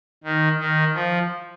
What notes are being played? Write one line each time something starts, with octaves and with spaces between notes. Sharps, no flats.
D#3
D#3
F3